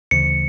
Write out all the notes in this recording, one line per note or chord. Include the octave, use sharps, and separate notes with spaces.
D2 C#3 E3 C#7